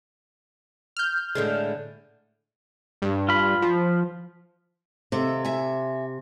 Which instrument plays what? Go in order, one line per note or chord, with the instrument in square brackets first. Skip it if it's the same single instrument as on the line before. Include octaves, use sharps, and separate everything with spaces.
[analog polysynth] F6 G6
[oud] A2 D3 G#3
[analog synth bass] G2
[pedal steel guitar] F4 B5
[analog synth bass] F3
[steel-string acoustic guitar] D#2 A4 E5 [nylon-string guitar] C3
[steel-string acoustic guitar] E5 G#5